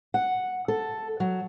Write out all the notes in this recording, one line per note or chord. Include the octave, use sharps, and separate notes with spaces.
F#5
A4
F#3